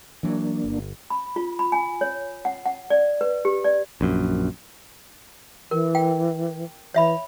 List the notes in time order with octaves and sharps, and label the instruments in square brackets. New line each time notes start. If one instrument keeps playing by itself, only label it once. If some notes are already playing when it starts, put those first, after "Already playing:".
[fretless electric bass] E3 F#3 [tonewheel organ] A#3 D4
[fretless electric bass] G1
[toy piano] B5
F4
B5
G#5
C#5
F#5
F#5
D5
B4
G4
D5
[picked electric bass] A#1 F#2
[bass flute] E3 [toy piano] A#4
[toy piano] G5
[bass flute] E3 [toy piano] C#5 E5 B5